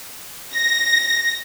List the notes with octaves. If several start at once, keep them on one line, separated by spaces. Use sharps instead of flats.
A#6